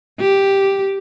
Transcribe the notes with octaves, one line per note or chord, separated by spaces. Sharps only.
G4